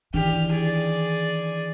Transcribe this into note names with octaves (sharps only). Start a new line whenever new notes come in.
D#3 E3 D4 G4 F6
G#4 D5